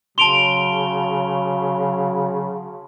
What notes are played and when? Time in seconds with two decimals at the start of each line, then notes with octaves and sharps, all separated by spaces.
0.18 C#3 F#3 A5 C6 D7 F7 G7